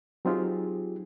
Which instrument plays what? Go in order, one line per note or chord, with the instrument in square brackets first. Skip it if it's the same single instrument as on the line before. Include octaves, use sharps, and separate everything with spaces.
[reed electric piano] F#3 C4 D#4 F4 G4 G#4